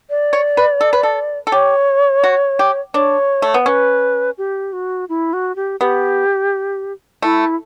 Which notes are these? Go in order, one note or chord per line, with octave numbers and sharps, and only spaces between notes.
D5
C#5
B4
A4
B4
A4
A4
G4 C#5
F#4
G4
D4 C#5
A3
B3
C#4 B4
G4
F#4
E4
F#4
G4
B3 G4
A3 E4